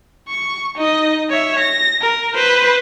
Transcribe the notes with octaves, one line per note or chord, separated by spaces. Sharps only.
C#6
D#4 D#5
C#5 E5
A#6
A#4
B4 C5